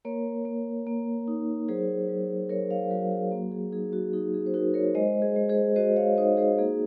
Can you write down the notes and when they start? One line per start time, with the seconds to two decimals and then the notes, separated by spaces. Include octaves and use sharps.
0.05 A#3 A#4 C#5
0.45 A#3
0.87 A#3
1.28 D#4
1.68 F#3 G#4 C5
2.09 F#3
2.49 F#3 A#4 C#5
2.70 C#5 F5
2.90 F#3 F#4 A#4
3.11 G#4
3.32 A#3 F#4
3.52 G#4
3.72 D#4 G#4
3.93 F#4
4.13 D#4 G#4
4.34 G#4
4.46 C5
4.54 D#4 F#4 A#4
4.74 A#4 C#5
4.95 G#3 C5 D#5
5.22 G#4
5.36 G#3
5.49 G#4 C5
5.76 F#4 C5 D#5
5.97 C#5 F5
6.17 D#4 C5 D#5
6.37 G#4 C5
6.58 A#3 G#4